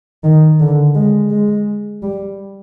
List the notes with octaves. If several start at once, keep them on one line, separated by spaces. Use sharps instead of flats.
D#3
D3
G#3
G#3
G3